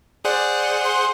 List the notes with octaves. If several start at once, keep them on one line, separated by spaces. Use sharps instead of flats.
G#4 C5 D5 F#5
C6